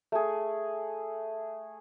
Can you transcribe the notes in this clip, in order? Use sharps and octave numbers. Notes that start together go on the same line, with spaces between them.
A3 G#4